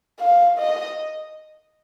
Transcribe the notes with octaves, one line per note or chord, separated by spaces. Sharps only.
F5
D#5